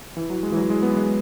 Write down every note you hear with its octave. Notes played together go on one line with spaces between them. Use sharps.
E3
F#3
G#3
E3
F#3
G#3
B3
G#3